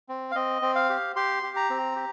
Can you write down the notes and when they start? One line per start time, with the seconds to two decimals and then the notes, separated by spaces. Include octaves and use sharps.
0.09 C4
0.31 F5
0.35 C4 D#5
0.62 C4
0.75 F5
0.90 G4
1.16 G4 C6
1.43 G4
1.56 A#5
1.70 C4
1.96 G4